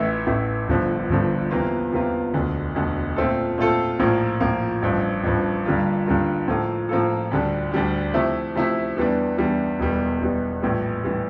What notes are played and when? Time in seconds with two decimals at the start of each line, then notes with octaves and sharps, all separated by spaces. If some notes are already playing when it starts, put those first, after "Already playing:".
Already playing: A1 A2 E3 A3 E4
0.27 A1 A2 E3 A3 E4
0.67 G1 G2 D3 F3
1.09 G1 G2 D3 F3
1.51 E2 C3 E3 A#3 F4
1.92 E2 C3 E3 A#3 F4
2.34 E1 D2 D3
2.75 E1 D2 D3
3.16 A#2 A3 C4 F4 A4
3.58 A#2 A3 C4 F4 A4
4.00 A#1 A2 F3 A#3
4.40 A#1 A2 F3 A#3
4.82 A1 G2 F3
5.23 A1 G2 F3
5.65 G2 D3 G3 A#3 F4
6.06 G2 D3 G3 A#3 F4
6.48 A2 F3 A#3 F4 A4
6.89 A2 F3 A#3 F4 A4
7.31 D2 D3 G3 D4
7.72 D2 D3 G3 D4
8.14 C3 F3 A3 E4
8.55 C3 F3 A3 E4
8.96 E2 E3 G3 D4
9.38 E2 E3 G3 D4
9.80 E1 E2 E3 G3
10.21 E1 E2 E3 G3
10.62 A#1 A2 E3 G3
11.04 A2 E3 G3